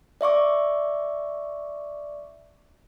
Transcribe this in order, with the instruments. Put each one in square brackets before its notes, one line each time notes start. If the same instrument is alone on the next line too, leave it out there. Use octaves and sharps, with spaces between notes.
[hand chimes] D5 E5 C#6 D6